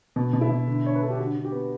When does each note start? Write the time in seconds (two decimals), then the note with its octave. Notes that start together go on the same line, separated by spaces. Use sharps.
0.16 B2
0.33 B2
0.41 E4
0.50 B2
0.67 D3
0.84 D3 C#5
0.95 B4
1.01 D3 A4
1.10 G4
1.18 D3 F#4
1.36 D3
1.45 G4
1.52 B3